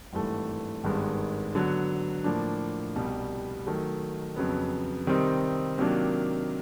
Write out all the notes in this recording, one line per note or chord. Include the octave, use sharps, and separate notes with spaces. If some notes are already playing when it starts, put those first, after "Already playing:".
G#1 G2 E3 A3
G#1 G2 D#3 G#3 B3
D3 F#3 B3
A2 F3 A#3 D4
C2 B2 G3
D#3 F#3 A3
F2 C#3 F#3 B3
C3 D#3 G3 C4 D#4
C3 D#3 F#3 A#3 D4